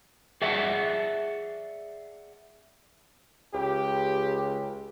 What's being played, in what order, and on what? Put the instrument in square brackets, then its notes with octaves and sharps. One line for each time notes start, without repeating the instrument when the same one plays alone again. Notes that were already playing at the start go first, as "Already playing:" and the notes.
[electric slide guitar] G#4 D5 E5 F#5 A5
[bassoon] C#2 [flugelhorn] G4